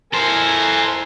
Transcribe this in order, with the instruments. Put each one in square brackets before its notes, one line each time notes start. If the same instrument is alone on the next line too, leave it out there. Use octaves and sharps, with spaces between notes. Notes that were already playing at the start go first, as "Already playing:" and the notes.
[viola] E4 A#4 [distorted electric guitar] A4 C5 [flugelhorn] G#5